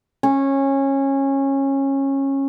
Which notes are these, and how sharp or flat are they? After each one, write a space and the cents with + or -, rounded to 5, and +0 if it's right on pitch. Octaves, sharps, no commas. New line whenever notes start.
C#4 -20